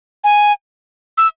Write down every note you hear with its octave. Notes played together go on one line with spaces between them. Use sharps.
G#5
E6